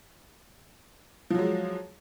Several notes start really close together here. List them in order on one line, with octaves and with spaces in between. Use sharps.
F3 F#3 G#3